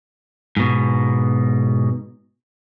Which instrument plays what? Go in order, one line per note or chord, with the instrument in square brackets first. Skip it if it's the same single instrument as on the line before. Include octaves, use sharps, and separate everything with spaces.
[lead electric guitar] G#2 B2